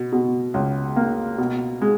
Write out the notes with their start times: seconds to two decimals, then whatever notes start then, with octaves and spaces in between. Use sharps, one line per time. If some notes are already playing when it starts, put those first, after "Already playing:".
Already playing: B2
0.12 B2
0.54 C#2
0.96 A#3
1.38 B2
1.82 G#3